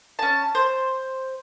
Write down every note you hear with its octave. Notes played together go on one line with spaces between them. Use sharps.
C#4 A5
C5